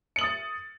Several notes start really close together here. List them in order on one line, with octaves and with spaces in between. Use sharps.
C#7 F#7 D#6 A6